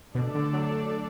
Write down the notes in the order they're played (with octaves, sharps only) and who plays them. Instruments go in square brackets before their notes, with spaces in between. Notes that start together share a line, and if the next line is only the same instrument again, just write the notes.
[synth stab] B2 [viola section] A3 D4 A4 D5
[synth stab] D3
F#3